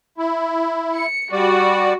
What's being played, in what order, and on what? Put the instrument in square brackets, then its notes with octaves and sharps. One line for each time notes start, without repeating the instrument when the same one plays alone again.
[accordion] E4
[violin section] C#7
[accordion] G3 D5 [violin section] F#4